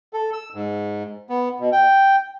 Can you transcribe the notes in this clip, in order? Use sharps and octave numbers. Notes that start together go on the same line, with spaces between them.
A4
E6
G#2
B3
B2
G5